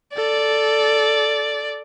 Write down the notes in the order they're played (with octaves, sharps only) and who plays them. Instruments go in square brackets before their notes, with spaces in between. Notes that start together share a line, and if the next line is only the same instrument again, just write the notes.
[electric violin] A4 [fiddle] D5